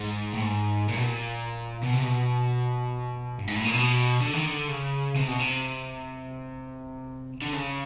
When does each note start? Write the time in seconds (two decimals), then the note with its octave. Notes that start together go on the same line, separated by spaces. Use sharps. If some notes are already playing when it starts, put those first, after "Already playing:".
Already playing: G#2
0.34 A2
0.41 G#2
0.89 A#2
0.96 B2
1.03 A#2
1.83 B2
1.94 C3
2.04 B2
3.39 G2
3.47 G#2
3.56 A2
3.65 A#2
3.73 B2
4.21 D3
4.33 D#3
4.46 D3
4.68 C#3
5.16 C3
5.28 B2
5.39 C3
7.42 D3
7.53 C#3